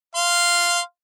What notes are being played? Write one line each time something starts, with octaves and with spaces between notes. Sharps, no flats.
F5 C6